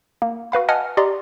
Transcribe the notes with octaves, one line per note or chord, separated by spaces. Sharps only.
A#3
F#4 B4 F5 B5
D#5 F#5 G#5 A5 D#6 F6
G4 D5 D#5 A#5 C6